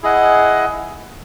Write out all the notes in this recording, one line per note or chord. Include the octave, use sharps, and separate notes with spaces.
E4 G#4 D#5 F#5